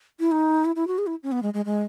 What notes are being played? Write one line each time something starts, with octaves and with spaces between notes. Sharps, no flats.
E4
D#4
E4
E4
F#4
G#4
E4
C#4
B3
G#3
G#3
G#3